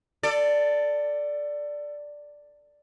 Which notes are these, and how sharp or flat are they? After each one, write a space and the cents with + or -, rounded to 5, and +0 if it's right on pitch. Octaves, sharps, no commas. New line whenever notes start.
A4 +20 D5 +0